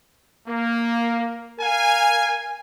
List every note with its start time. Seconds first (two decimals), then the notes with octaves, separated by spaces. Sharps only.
0.47 A#3
1.59 A#4 F5 G#5